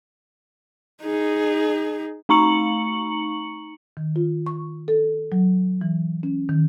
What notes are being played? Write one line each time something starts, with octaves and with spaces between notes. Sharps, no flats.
D#4 G#4
A3 D#4 A#5 C#6 C#7 F#7
D#3
F4
C#6
A4
F#3
E3
C#4
D#3